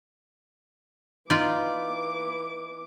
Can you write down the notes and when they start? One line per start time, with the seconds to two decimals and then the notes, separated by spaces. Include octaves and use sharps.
1.30 E3 D#4 F4 D5 D6